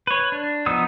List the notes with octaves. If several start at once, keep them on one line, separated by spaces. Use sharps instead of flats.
B4 C#5
D4
F3 B3 D#4 D#6 E6